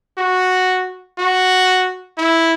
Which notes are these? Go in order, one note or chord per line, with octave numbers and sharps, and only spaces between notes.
F#4
F#4
E4